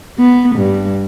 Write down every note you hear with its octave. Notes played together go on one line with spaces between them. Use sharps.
B3
G2